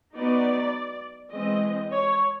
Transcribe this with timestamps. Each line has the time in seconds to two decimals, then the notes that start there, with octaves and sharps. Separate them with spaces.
0.14 F#3 B3 D#4 D5
1.32 E3 G#3 C4 D#5
1.91 C#5